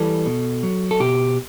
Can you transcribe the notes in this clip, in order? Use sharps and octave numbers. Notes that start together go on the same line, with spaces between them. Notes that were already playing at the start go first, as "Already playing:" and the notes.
Already playing: E3 G3 A4
B2
F#3
A4
B2 G4